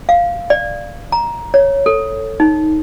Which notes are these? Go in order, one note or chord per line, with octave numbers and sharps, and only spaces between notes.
F5
D5
A#5
C#5
A4
D#4